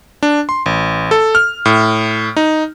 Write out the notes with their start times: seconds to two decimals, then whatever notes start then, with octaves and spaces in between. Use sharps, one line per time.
0.23 D4
0.49 C6
0.66 A1
1.11 A4
1.35 F6
1.65 A2
2.36 D#4